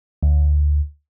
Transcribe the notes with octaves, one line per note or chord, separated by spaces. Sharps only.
D2